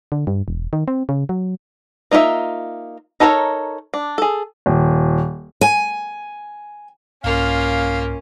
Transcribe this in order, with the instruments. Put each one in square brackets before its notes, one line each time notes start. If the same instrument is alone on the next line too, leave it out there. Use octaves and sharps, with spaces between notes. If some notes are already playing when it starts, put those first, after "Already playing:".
[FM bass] D3
G2
E1
D#3
C4
C#3
F#3
[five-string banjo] A#3 D#4 F4 A#4 E5
D#4 A4 A#4 C5 C#5
D4
G#4 A4
[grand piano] D#1
[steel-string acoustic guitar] G#5
[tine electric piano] C2 G#2 [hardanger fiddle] A#3 F4 [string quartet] C#4 [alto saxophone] F5